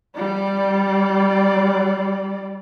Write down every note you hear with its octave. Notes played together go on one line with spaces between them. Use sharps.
G3 D5